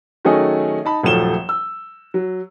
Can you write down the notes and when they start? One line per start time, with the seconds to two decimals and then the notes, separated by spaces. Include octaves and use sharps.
0.25 D#3 F#3 A3 C#4 G#4 D#5
0.85 D#4 A5 B5
1.03 D#1 F#2 F3 A3 E7 G7
1.49 E6
2.14 F#3